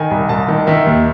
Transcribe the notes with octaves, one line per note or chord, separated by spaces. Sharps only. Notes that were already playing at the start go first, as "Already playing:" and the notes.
Already playing: D#3 G#5
C2
C2 A5
D#3
D#3 E5
D#2